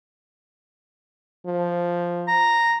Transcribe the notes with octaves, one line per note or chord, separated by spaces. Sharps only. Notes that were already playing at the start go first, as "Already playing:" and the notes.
F3
A#5